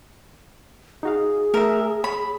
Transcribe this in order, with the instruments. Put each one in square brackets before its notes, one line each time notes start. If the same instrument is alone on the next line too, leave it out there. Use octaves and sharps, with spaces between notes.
[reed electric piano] D#4 F#4 F5 [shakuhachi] G#4
[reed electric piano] A3 [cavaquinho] A#4 E5
[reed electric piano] C#5 [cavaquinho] B5